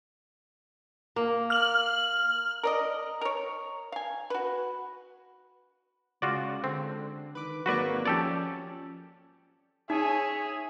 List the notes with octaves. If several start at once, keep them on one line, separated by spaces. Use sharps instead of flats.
A#3
F6 F#7
A#4 D5 D#5
A#4 C#5
F5 G#5
F#4 B4
C#3 G#3 F4 F#4 D5
D3 C4
D#3 B4 D6
G#1 F#3 A#3 F#4 B4 D5 C#6
F3 C#4 G4 A4 D5
D#4 G#4 C#5 E5 G#5